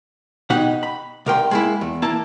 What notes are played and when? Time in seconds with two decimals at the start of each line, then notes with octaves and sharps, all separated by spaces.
0.50 B2 D#4 G4 F#5
0.83 B5
1.26 C2 A#4 G5 C6
1.51 G#3 A#3 E4
1.81 E2
2.02 A#3 E4 A5